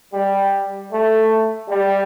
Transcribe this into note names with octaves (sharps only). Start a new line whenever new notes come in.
G3
A3
G3